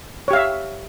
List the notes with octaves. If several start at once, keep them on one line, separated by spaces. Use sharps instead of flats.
G4 C#5 E5 F5